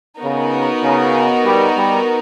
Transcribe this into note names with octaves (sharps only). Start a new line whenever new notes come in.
C#3 B3 D#4 F#4 A#4
C#3
G3
G3